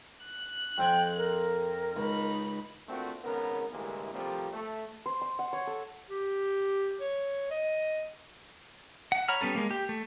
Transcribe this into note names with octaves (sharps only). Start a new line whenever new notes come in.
F#6
F2 C4 G5 G#5
A#4
C#2 D#4 B5
A3 A#3 C4 D4 F4 F#4
G#1 C#3 B3 A#4
A2 D3 E3 G3 G#3 A#3
C3 F3 G3 A3 A#3 C4
A3
C5
C6
F#5
C#5
A4
G4
C#5
D#5
F#5
C#5 A#5 B5 F6
G3 B3 C#4 A4
G#3 A#3
G4
A3